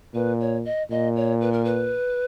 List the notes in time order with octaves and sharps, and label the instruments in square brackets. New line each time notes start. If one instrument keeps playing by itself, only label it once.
[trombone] A#2 [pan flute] B4
[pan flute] C#5
D#5
[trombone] A#2 [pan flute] D#5
[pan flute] C#5
B4
A#4
B4